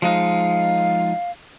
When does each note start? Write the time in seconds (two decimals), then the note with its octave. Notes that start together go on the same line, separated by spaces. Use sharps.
0.02 F3 G#3 D#4 F5